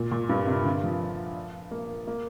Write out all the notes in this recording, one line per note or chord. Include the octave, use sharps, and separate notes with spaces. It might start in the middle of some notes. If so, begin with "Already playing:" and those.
Already playing: A#2
A#2
G2
C3
D3
F3
A#3
A#3